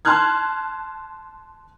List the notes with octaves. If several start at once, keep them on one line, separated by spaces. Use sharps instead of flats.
A5 C6 F6 F#6 G#6